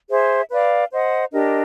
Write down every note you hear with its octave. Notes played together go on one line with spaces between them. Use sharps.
G#4 C5 E5
B4 D5 F5
C5 D#5 F#5
D4 G4 A#4 D#5